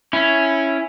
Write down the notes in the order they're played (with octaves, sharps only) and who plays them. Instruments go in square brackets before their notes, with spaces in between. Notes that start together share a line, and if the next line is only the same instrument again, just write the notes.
[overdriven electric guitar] C#4 [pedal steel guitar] E4